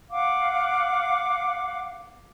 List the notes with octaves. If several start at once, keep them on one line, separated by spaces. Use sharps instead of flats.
F5 F#5 D6